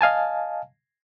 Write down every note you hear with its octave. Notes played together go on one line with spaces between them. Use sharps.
D#5 F5 G#5 A5